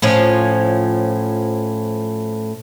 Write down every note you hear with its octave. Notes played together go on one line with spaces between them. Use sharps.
A2 F3 C#4